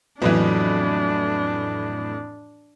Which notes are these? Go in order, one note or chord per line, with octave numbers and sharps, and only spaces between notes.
F2 A2 E3 F#3 B3 D4